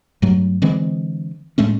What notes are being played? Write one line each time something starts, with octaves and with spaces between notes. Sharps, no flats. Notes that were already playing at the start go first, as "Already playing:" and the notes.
G2 F#3 A3
D3 E3 G#3 C4
A2 G#3 A3 C#4